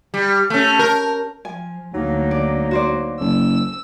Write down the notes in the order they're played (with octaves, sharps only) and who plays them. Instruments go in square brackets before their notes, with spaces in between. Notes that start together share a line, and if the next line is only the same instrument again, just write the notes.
[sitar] G3
A3 C#4
A#4
[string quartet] F3 [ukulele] G#5
[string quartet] D2 [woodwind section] F#3 A#3 D#4
[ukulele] D5
F#4 C5 D5
[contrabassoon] F#1 [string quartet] E6